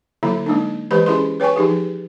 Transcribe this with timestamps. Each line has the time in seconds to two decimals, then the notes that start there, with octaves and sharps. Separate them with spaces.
0.23 D3 F#3 A#3 E4 B5
0.46 G#3 A#3 D4 D#4
0.91 E3 G#3 G4 B4 C5 B5
1.06 C#4 E4 G#4 B5 C6
1.40 B4 C#5 G5 G#5 C#6
1.56 F3 D#4 G4 G#4